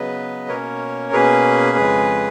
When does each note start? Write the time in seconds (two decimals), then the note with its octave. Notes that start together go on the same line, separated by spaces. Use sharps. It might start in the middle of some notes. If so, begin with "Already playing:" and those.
Already playing: C#3 F#3 B3 B4 D#5
0.48 B2 A#3 C#4 A#4 C#5
1.13 B2 A#3 C#4 G#4 B4
1.77 F2 C#3 G#3